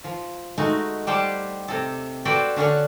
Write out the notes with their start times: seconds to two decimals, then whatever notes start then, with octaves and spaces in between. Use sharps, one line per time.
0.04 F3
0.58 G#3 A3 D#4 F#4
1.07 G3 G4 C5 F#5 G5 A5
1.68 C3 A4
2.25 F#4 A4 B4 C5 D5 G5
2.56 D3 C#4 D4 F#5